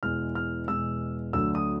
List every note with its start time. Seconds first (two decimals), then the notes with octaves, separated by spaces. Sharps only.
0.03 E2 B2 G#3 F6
0.35 F6
0.68 E2 B2 G#3 E6
1.33 D2 D3 F#3 A3 D4 E6
1.55 D#6